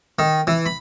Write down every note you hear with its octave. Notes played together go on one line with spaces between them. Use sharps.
D#3
E3
B5